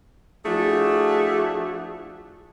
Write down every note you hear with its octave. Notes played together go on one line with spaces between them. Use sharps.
F3 A3 D4 E4 F#4 G#4